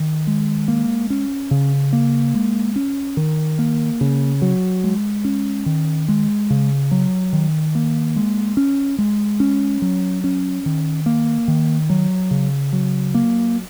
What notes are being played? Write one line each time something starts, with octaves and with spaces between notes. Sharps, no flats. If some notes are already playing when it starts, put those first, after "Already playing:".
Already playing: D#3
G#3
A#3
C#4
C#3
A#3
G#3
C#4
D#3
A#3
C#3
F#3
G#3
C#4
D#3
G#3
C#3
F#3
D#3
A#3
G#3
C#4
G#3
C#4
F#3
C#4
D#3
A#3
D#3
F#3
C#3
F#3
A#3